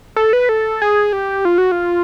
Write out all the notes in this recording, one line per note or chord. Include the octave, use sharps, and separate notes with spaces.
A4
B4
A4
G#4
G4
F4
F#4
F4